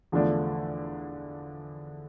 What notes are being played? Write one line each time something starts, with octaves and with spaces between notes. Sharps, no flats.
E2 D3 F3 A3 D4